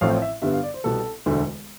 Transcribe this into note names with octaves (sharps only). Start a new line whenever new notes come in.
A1 A2 F3 A3 C4 F5
E5
G2 D3 G3 B3 E5
F5
D5
C5
C2 B2 G3 B3 A4
E1 D2 D3 A3